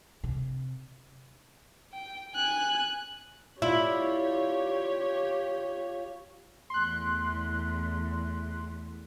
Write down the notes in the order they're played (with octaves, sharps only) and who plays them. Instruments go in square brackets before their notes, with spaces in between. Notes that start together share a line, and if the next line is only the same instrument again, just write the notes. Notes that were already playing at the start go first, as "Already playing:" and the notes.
[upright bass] C3
[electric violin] G5
G#5 F#6
[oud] E4 [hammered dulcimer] F4 D5 [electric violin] G4 C#5
[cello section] E2 A3 [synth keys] C6 F#6